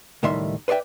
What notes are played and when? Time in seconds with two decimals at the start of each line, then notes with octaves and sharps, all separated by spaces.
0.23 C#2 A2 D#3 G3 E5 C6
0.68 B4 C5 D5 E5 G5